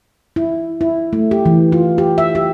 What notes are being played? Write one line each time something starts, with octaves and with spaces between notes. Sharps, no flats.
E4
E4
A3
G4
E3
F4
G4
E5
G4